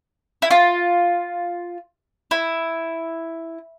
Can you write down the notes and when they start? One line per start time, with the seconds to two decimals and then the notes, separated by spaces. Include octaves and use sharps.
0.42 E4
0.51 F4
2.31 E4